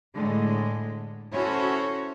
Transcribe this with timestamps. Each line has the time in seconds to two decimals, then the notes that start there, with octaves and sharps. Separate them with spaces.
0.15 A2 D3 G#3
1.31 C#4 E4 F#4 A4 C5 C#5